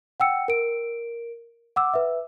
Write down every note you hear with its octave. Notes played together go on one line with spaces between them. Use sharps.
F#5 G5 E6 C#7
A#4 D7
F#5 D6 E6
B4 E5